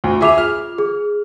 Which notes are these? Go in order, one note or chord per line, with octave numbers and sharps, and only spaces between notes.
D2
F4 G#4 E5 D6 F7
F6
G#4